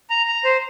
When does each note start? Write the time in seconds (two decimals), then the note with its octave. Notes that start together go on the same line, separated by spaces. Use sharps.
0.10 A#5
0.28 A#5
0.45 C5